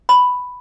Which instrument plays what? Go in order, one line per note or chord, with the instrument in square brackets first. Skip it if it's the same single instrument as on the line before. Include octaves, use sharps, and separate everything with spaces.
[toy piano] B5